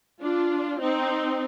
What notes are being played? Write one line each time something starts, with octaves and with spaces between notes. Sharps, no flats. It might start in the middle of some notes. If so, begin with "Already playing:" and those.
D4 F4
C4 D#4